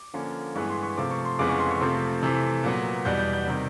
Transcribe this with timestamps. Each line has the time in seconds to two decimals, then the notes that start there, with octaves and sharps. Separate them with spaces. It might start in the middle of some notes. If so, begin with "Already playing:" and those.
Already playing: D6
0.14 D3 F3 A#3 C#4
0.55 G2 E3 G#3 B3 C#6
0.69 C6
0.83 C#6
0.97 C3 F3 A3 D6
1.11 C#6
1.25 C6
1.39 F2 C#3 E3 G#3 B3 D6
1.49 C#6
1.60 C6
1.71 C#6
1.81 C3 F3 A3 C4
2.23 C3 E3 A3
2.64 A#2 F#3 B3
3.05 E2 B2 G3 B3 G6
3.19 G6
3.33 G6
3.47 C3 D#3 G3